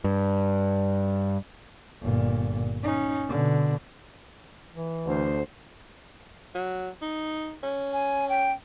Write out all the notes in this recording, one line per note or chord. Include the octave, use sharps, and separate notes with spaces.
G2
G1 A#2
C#4 D#4
B2 D3
E3
D2 C5
F#3
D#4
C#4
G#5
G5